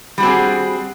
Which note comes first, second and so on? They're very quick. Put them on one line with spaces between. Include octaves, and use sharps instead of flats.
G3 F#4 C4 G#4